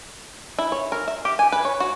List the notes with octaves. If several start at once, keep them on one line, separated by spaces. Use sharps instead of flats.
E4
C#5
A#4
E5
G4
G#5
B4
C#5
F#4